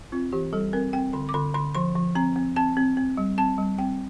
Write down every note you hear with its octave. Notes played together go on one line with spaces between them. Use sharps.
C4 F4
E3 G4
G3 A4
C4 A#4
C4 G5
D3 C6
D6
D3 C6
D3 C6
F3 C6
F3
C4 A#5
C4
C4 A5
C4
C4
G3
C4 A5
G3
C4 G5